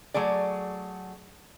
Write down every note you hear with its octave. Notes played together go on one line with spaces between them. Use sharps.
F#3 A3 G#4 D5